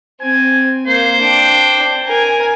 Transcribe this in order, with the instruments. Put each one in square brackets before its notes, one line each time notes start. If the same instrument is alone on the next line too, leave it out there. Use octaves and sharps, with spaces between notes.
[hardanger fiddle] C4 [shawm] G#5
[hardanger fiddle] A#3 [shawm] C5
[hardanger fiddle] D4 G5
A#4 G#5